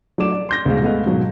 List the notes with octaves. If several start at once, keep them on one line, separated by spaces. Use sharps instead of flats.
F#3 A3 D4 D6 E7
D5
C6 G6 A#6
D2 B2 G#3 F5
G#3 A3 B3 D#5 F5
G#2 B2 D#3 F#3